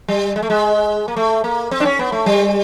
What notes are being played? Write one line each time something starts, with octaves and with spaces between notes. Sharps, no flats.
G3
G#3
A3
G#3
A#3
A3
A#3
C4
D4
C#4
B3
A3
G3